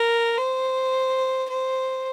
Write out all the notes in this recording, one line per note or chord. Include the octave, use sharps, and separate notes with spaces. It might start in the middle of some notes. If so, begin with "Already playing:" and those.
Already playing: A#4
C5
C5